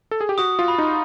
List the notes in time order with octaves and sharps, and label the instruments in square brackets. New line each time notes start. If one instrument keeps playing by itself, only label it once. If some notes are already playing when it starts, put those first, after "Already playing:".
[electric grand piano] A4
G#4
G4
[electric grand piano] F#4 [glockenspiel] D#6
[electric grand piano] F4
[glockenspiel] B5
[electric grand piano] D#4